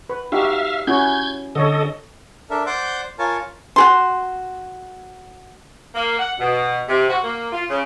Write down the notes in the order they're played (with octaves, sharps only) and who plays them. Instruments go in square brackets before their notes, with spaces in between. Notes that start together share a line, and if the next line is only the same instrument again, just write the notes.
[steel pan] B4
[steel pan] D#4 F#4 G4 [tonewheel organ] E5 F5
[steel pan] C#4 E4 F#4 [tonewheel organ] G6 G#6
[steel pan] D3 C#5 [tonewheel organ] A4 D#5
[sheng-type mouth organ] D4 A4 A#4 E5
C5 D5 F#5 C6 D6 G6
F4 A#4 C#5 G#5 A5
[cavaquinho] F#4 G#4 C6
[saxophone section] A#3
F#5
B2
C3
F#4
A#3
F4
C#3